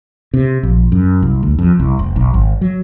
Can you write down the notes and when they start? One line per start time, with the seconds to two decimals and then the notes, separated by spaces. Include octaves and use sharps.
0.34 C3
0.63 A#1
0.92 F#2
1.22 C2
1.43 D2
1.59 F2
1.80 C2
1.99 F1
2.16 B1
2.34 G#1
2.61 F#3